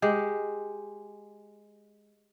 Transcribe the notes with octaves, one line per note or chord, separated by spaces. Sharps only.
G#3 G4